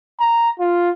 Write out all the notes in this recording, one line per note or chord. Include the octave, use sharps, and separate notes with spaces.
A#5
F4